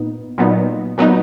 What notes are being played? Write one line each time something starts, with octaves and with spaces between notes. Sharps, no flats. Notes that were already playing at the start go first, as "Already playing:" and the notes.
Already playing: A#2 B3 D#4
A#2 F#3 B3 D#4
A#2 F#3 B3 D#4